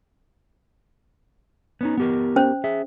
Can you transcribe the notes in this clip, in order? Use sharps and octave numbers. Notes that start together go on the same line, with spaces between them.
B3 C#4 D#4
B3 G4 A#4
C#4 C5
G#4 E5